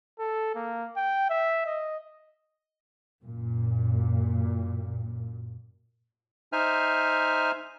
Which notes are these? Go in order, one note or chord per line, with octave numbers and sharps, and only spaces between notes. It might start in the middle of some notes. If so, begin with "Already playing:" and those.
A4
A#3
G5
E5
D#5
F#2 A#2
D#4 C5 E5 G#5 F6